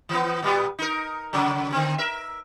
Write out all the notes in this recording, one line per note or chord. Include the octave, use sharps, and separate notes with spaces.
E3 B3
A#2 G3 B3
D#4 A#4
C#3 F#3
D3 C4
A#4 E5